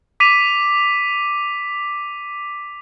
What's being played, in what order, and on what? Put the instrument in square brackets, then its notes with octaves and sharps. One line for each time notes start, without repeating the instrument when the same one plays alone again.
[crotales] D6 B6 D#7 F7